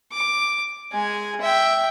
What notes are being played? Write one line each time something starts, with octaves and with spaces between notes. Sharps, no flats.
D6
G#3 G#5
E5 G5